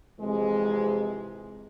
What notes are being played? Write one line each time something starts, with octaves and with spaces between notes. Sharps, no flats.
F2 C3 E3 G#3